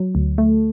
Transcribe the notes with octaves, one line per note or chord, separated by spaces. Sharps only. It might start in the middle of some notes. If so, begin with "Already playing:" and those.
Already playing: F#3
D2
A3